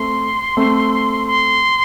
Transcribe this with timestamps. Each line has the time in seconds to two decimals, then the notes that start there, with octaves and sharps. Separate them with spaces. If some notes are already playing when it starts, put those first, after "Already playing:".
Already playing: A3 C4 C6
0.57 A3 C4
1.27 C6